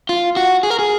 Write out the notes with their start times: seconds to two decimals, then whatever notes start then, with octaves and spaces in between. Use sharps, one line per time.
0.09 F4
0.37 F#4
0.63 G#4
0.70 A#4
0.79 G#4